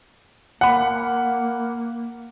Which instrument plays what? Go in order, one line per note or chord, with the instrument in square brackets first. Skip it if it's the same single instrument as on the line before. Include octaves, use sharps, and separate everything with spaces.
[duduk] A#3 [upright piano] F#5 B5